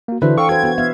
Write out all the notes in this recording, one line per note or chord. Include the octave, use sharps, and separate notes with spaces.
A#3 F#4
D3 E3 D4 E4 F#4 B4 C5 E5
A4 F5 G5 C#6
F#4 B4 C5 G#6
B3 F#4 C5
B3 E5 F5